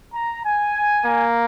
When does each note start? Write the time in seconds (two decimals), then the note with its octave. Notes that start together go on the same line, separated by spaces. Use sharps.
0.13 A#5
0.44 G#5
1.05 A#3